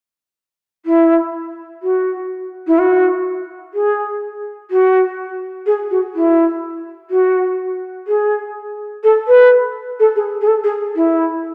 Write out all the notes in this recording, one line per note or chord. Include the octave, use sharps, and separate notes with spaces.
E4
F#4
E4
F#4
G#4
F#4
G#4
F#4
E4
F#4
G#4
A4
B4
A4
G#4
G#4
A4
G#4
E4